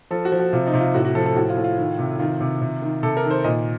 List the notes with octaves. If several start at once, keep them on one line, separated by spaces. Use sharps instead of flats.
F3 A4
F#4
F3
F#4
C3 F4
D#4
C3
F4
A2 F#4
F#4
F3 A4
A4
A2 F#4
F4
A2
F4
D#3
C3
D#3 F4
C3
C3
D#3
C3 A4
A#4
D#3
C5
A#2 D#5